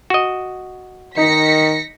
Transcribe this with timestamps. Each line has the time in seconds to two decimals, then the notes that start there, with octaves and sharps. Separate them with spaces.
0.10 F#4 D#5
1.17 D#3 D#4 A#6 B6 C#7